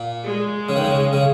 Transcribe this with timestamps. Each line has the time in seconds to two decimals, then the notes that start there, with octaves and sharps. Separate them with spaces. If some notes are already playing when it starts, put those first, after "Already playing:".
Already playing: A#2
0.24 G#3
0.69 C#3
0.76 D#3
0.84 C#3
1.13 C#3